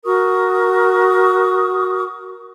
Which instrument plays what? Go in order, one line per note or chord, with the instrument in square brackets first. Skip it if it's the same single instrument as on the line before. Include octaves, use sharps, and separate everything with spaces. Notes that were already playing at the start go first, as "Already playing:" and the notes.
[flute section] F#4 A#4 C#6 D#6